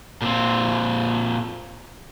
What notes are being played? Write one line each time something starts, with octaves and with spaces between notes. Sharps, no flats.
A#2 C4